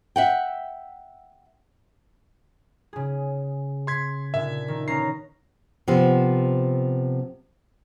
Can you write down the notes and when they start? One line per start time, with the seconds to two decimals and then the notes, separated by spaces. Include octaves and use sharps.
0.16 E5 F#5 G5
2.93 C#3 G#4
3.87 C6 G#6 B6
4.34 A#2 D3 E5
4.68 D#3
4.88 B3 C#4 A#5 C7
5.88 C3 F3 B3